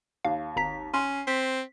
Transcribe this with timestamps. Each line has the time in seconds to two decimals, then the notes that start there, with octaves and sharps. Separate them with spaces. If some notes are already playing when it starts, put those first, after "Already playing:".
0.25 D#2 F5
0.56 G#1 A#5 B6
0.94 C#4 C6
1.27 C4 B6